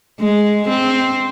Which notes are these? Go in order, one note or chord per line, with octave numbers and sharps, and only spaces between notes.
G#3
C4